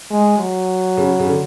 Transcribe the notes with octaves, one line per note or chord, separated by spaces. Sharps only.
G#3
F#3
C#3
C#3
D3